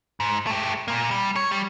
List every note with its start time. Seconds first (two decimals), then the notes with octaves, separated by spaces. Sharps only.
0.20 G#2
0.47 A3 G4
0.88 A#2 A#3
1.11 G3
1.36 C#5
1.51 G3